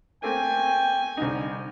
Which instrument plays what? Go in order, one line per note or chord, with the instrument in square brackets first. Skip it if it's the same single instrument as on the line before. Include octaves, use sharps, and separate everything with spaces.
[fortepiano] A3 A#3 C4 [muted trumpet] G5 [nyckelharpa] G#5
[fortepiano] C2 D3 D#4